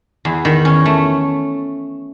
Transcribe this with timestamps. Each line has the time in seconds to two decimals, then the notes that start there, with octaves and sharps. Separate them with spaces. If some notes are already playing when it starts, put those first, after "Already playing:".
0.25 E2
0.45 D#3
0.65 C#4
0.86 A3